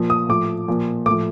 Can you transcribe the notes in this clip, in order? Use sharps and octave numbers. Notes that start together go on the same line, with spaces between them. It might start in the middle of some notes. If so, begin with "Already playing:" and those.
Already playing: A#2 F3
D#6
A2 F3 D6
A#2 F3
A2 D6
F3